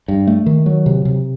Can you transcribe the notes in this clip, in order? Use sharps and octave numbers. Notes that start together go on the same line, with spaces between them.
G2
A3
D#3
F#3
C3
C3